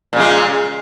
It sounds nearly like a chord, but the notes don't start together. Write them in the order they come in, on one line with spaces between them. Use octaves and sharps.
A#2 C#3 G#3